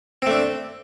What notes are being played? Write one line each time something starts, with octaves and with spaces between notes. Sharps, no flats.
A3 C4 D4